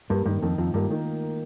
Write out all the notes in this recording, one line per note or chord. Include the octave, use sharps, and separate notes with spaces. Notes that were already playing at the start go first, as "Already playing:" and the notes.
G2 A#3
G2 D#3
F2 D#3
F2 F4
G2 A#3
D#3